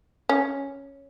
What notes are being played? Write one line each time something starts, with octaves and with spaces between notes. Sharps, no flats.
C#4